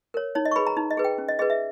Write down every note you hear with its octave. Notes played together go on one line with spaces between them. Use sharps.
A#4 C#5
D#4 C#5
D#5
C#6
G#4 B4 B5
A#5
D#4
D#5
G#4 B4
G5
C#4
D#5
G#4 B4 D#5
E5